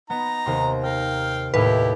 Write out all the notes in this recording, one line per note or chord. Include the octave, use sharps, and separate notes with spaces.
B3 D#4 A#5
D#2 C3 C6
A#4 F5 G5
D#2 A2 E4 G4 B4